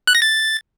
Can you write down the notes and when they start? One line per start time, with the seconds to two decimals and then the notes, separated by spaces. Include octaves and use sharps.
0.07 F#6
0.15 A#6
0.22 A6